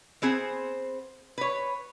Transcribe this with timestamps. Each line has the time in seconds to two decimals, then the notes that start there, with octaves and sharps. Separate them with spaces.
0.22 B3 C4 G#4 C5
1.38 B4 C#5